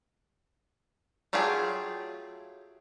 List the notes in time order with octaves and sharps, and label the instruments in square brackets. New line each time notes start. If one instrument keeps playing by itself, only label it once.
[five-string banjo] F#3 A3 F4 G4 G#4